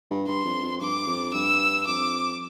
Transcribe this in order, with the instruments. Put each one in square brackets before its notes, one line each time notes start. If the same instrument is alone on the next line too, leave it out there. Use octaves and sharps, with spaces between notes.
[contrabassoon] G2
[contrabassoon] G2 [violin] C6
[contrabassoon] F2
F2
[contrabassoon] G2 [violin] D6
[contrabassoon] F2
[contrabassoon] G2 [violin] E6
[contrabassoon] F2 [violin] D6